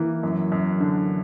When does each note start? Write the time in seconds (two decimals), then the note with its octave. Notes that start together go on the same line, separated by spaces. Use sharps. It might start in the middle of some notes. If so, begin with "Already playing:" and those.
Already playing: E3 A#3
0.23 F#2
0.52 F#2
0.80 D3